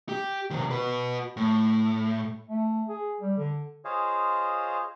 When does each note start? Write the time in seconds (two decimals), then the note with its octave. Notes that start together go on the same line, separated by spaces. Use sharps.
0.09 G4
0.50 C3 D#3
0.71 F#4 B4
1.37 A2
2.48 A3
2.89 G#4
3.20 G3
3.37 D3
3.85 F4 G#4 C5 C#5 D#5 F5